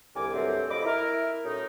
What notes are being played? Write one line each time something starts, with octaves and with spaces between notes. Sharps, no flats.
C2 D3 A#4 G#5 D6
C2 G2 F#3 A3 C4
F2 D#5 B5 D6
E4 A#4
F#2 A2 D#4